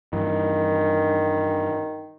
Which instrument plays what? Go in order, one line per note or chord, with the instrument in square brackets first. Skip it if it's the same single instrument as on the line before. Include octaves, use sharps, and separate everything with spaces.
[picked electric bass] G2 E3 [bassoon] D#3